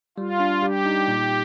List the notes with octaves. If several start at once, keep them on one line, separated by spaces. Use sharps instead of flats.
G3 F4
D4
G3 G4
D#4
A#2